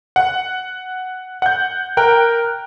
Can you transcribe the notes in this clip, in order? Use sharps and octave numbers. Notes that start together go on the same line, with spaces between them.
F#5
F#5 G6
A#4 G5 F#6